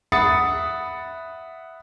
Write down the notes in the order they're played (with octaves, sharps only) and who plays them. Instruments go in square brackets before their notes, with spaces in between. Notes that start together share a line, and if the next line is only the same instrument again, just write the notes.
[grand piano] E5 F#5 B5 D#6 A6 C#7